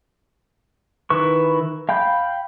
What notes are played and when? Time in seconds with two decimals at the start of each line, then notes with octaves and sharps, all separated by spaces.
1.10 D#3 E4 B4 C#6
1.89 F5 G5 B5 G6